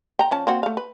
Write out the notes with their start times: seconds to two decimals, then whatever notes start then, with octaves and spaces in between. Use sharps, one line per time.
0.19 G5 A#5
0.31 F3 C#4 A5
0.47 A#3 C4 F#4
0.63 A3 F5
0.77 B4